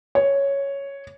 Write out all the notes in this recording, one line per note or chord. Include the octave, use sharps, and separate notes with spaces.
C#5